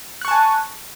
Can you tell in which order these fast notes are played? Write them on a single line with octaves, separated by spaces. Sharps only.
F#6 C#6 A5 G#5